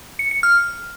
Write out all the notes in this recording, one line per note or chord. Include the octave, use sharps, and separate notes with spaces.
C#7
C#7
F6